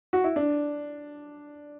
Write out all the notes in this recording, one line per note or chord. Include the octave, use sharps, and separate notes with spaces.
F#4
E4
D4